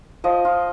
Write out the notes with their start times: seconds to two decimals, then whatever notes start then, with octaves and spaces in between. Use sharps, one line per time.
0.24 F3 D#5
0.45 F4